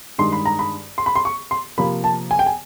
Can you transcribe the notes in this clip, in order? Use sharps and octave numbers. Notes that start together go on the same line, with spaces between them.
G2 D#3 G#3 C6
B5
A#5
B5
C6
B5
C6
C#6
C6
C3 F3 A#3 B5
A5
G#5
G5
G#5